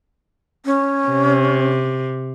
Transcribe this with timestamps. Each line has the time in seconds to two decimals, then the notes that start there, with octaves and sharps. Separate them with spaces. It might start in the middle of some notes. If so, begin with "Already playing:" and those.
0.65 C#4
1.09 C3